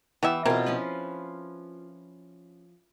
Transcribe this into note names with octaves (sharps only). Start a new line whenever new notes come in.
E3 B3 G4 E5
B2 C4 F4 G#4 A#4
F3 C#4 B4